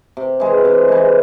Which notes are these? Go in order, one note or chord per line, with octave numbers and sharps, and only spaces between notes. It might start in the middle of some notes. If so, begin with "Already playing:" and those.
C3
E3 G#3
C3
E3 G#3